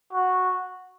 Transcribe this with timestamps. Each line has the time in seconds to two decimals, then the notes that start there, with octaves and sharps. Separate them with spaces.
0.13 F#4